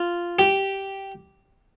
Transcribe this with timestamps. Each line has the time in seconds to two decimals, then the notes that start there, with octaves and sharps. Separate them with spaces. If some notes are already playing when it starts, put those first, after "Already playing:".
Already playing: F4
0.39 G4